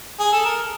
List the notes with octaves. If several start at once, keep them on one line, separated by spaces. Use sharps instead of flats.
G#4
A4
A#4